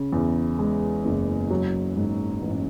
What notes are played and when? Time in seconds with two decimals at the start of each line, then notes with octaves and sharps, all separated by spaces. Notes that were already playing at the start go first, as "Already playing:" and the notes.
Already playing: C#3
0.13 E2
0.59 G#3
1.05 F#1
1.50 F#3
1.96 G#2
2.42 A1